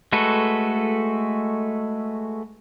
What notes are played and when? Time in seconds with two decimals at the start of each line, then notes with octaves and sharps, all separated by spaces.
0.13 G#3 A3 F#4 A4 B4